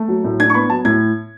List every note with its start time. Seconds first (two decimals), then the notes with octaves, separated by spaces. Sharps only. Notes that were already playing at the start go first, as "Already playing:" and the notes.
Already playing: A3
0.08 F#3
0.24 A2
0.40 D4 G#6
0.50 C#6
0.54 B3 B5
0.70 F#3 A5
0.85 A2 G#6